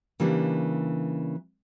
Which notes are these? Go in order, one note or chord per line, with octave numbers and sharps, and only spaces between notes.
C#3 E3 G3 A#3 D4